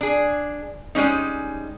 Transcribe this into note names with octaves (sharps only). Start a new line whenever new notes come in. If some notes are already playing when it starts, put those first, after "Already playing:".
D4 G#4
G3 G#3 C#4 D#4